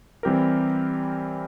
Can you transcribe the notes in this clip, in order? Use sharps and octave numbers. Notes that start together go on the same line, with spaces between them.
E3 G3 C4 G4 A#4